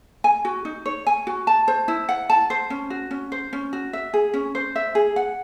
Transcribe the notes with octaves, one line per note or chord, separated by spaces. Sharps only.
G#5
F#4
D#4
C#5
G#5
F#4
A5
C5
E4
F#5
A5
C5
C#4
F#4
C#4
C5
C#4
F#4
E5
G#4
C#4
C5
E5
G#4
F#5